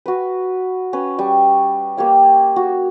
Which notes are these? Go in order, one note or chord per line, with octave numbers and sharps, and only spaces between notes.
F#4 B4
C#4 B4
G3 C#6
A#3 G4 C#5 F5
F#4